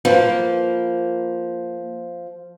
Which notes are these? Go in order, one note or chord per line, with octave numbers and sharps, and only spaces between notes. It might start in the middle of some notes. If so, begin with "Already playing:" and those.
F3 A#3 B4